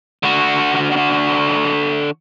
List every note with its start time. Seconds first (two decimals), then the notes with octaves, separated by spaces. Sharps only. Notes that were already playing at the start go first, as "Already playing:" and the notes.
0.23 D3 F#4